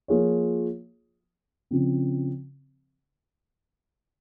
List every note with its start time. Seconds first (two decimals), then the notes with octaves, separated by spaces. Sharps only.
0.08 F3 A#3 F4 G#4 C#5
1.71 C#3 F3 C4